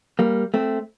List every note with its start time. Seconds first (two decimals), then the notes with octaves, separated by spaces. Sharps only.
0.19 G3 A#3
0.54 A3 C4